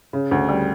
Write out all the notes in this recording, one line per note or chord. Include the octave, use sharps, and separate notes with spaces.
C#3
D2
G3